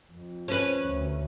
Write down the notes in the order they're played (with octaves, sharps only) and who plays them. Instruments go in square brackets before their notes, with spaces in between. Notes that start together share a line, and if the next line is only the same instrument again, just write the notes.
[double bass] F2
[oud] C#4 B4
[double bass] D2